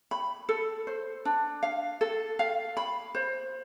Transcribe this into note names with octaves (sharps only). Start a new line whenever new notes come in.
B5
A4
C5
D4
F5
A4
F5
B5
C5